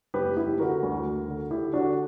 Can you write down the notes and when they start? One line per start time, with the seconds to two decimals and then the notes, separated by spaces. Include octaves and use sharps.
0.14 F#1 G4 B4
0.37 F#1 E4 G4
0.59 D3 F#4 A#4
0.82 D2
1.05 D2
1.28 D3
1.51 D3 E4 G4
1.73 D3 D4 F#4